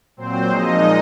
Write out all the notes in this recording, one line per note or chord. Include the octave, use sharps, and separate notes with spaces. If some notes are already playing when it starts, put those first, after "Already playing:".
A#2 F#3 C4 C5
A#2 F3 G#3 D#4 D#5